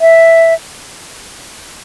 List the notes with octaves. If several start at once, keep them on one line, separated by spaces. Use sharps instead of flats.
E5